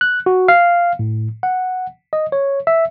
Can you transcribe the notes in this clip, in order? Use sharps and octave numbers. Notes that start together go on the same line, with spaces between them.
F#6
F#4
F5
A2
F#5
D#5
C#5
E5